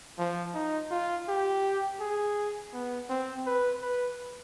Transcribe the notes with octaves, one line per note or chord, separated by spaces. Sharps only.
F3
D#4
F4
G4
G#4
B3
C4
B4
B4